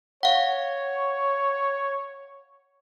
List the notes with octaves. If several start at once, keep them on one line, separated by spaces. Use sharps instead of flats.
C#5 F5 F#5